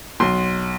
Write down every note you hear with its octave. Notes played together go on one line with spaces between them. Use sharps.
B1 C6